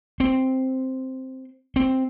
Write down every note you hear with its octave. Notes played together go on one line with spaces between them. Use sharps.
C4
C4